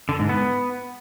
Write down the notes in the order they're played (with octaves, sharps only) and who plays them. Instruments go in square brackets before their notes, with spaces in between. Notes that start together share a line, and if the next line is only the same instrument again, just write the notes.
[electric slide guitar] D3
G#2
B3